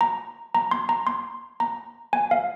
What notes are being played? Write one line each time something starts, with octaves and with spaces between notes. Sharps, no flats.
A#5
A#5
C6
A#5
C6
A#5
G#5
F5